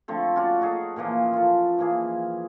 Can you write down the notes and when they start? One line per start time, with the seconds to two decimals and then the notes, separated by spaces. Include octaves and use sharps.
0.08 D3 F3 A3 C4
0.36 C#4 F4 F#4 D5
0.61 D#4 F#4 G#4 A4
0.96 A#2 E3 F3 A#3
1.33 F4 A4
1.78 E3 F3 A#3 G#4